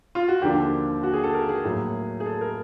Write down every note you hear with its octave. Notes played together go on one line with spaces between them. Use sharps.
F4
F#4
D#2 D3 F3 A#3 D4 G4
F#4
G#4
A4
A#4
G#4
A2 F#3 A#3
G#4
A4
A#4